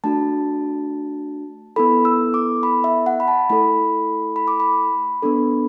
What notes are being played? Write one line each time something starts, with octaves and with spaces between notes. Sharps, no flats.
A3 D4 F#4 A5
B3 E4 A4 B5
E6
D6
B5
E5
F#5
B5
A5
A3 E4 A4 B5
B5
D6
B5
B3 D4 A4